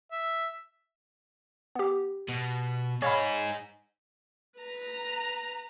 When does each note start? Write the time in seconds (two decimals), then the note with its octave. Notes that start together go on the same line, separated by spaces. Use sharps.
0.12 E5
1.75 B3 G4
2.28 B2
3.02 D#4 G#4 C#5 F5 B5
4.59 B4 A#5